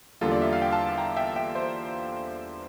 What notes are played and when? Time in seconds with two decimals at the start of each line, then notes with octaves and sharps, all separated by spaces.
0.21 E2 D3 G3 A#3 F4 A4
0.32 D5
0.42 E5
0.53 F5
0.62 G5
0.72 F5 A5
0.98 G5 A#5
1.17 E5 G5
1.36 E5 G5
1.55 C5 E5